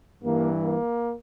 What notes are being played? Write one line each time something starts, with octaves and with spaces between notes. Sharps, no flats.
G2 E3 G3 A#3
A#3